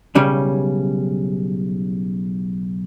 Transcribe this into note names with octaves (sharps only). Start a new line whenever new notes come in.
B1 C#3 G3 C#4